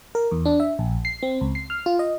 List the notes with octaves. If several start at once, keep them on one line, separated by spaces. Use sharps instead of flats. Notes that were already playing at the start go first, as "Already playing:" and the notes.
A#4
E2
D4
E5
A#1
C7
C4
C#2
C7
F6
F4
D#5